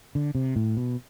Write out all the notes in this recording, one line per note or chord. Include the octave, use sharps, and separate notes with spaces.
D3
C3
A2
B2